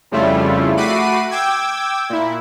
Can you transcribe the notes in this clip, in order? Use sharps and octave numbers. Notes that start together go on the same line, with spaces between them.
F2 C#3 G3 A3 E4 F4
A3 F#4 B5 D6 C7 D#7
G5 D6 E6 G#6
A#2 E4